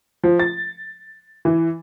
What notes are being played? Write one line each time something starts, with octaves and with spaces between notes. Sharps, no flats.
F3
A6
E3